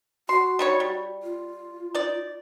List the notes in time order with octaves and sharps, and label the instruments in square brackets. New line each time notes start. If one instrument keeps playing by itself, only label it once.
[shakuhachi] F#4 [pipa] C6
[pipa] G3 D#4 C#5
G3
[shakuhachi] F4
[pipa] D#4 D5